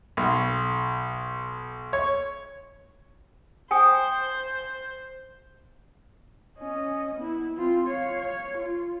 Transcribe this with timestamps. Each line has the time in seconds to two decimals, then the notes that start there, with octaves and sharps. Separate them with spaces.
0.17 B1
1.93 C#5
3.71 C5 G5 G#5 D#6
6.58 C#4 D#5
7.15 B3 E4
7.57 C4 F4
7.87 C#5 F5
8.21 C#5
8.57 F4